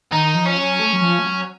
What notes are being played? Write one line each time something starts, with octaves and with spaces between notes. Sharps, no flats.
D#3 D#4
F3
C#4
F#3
A3
F#3
F3
A3
F#3